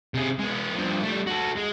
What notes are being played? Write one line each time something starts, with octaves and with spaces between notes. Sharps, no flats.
C3 G#4
G#3 B3
G2 F3
G3 A3
F#4 A4
G#3